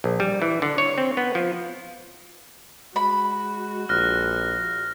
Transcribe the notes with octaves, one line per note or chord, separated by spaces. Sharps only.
A#1
G3
E3
D3
C#5
C4
B3
F3
G#3 F#4 B5
A#1 F6 F#6 A#6